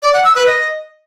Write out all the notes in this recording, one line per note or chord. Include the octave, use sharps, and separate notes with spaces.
D5
F#5
E6
B4
D#5